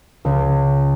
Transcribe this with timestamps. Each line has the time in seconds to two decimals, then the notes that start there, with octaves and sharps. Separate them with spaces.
0.25 C#2